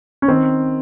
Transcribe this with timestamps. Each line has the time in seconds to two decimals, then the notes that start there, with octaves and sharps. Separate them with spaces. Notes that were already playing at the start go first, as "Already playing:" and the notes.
0.22 C#4
0.28 D#3 C4